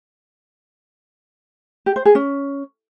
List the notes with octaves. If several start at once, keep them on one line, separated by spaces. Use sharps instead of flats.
G4
C5
G#4
C#4